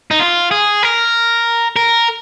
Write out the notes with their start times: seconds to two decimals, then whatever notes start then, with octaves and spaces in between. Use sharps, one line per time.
0.11 D#4
0.19 F4
0.51 G#4
0.83 A#4
1.76 A#4